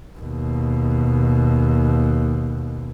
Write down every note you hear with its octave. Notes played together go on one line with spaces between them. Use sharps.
D#2 B2